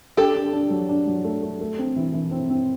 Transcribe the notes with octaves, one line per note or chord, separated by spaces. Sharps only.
D4 G4 A4
D4
D4
F#3
D4
F#3
A3
A3
A3
C4
E3
E3
C4
C4